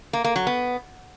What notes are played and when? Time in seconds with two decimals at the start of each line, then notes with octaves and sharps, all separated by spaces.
0.13 A#3
0.24 A#3
0.36 F#3
0.47 B3